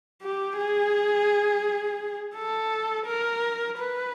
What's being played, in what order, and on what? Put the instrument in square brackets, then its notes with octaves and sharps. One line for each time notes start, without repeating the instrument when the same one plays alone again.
[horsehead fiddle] G4
G#4
A4
A#4
B4